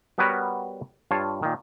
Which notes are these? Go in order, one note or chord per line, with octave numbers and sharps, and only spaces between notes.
G3 B3 F#4 A#4 B4 C#5
G2 F4 C#5 F5 A5
A#2 D#3